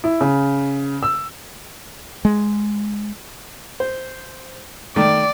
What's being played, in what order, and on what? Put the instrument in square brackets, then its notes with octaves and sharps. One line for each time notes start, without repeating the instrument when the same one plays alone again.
[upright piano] E4
C#3
E6
[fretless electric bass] G#3
[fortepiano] C5
[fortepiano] D#3 A3 [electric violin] D5